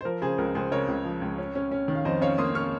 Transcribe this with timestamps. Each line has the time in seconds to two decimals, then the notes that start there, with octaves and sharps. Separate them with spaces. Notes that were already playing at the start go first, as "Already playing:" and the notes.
0.01 C5
0.05 F3 A#4
0.22 C#3 G#4 C5
0.38 C#2 A#4
0.55 C#2 G#4 C5
0.72 C#3 A#4 C#5
0.88 C#2
1.05 F3
1.22 C#2
1.38 C#4
1.55 C#4
1.72 C#4
1.88 D#3
1.95 F5
2.05 F2 C5 D#5
2.22 C#4 C#5 F5
2.38 A#3 C6 D#6
2.55 C#4 C#6 F6